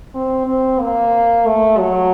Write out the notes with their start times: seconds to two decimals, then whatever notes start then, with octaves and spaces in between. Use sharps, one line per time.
0.15 C4
0.47 C4
0.80 A#3
1.46 A3
1.78 F#3